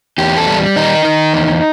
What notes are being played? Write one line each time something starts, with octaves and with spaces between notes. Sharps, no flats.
E2 G4
A4
G3
D#3 D#4
D#3
E2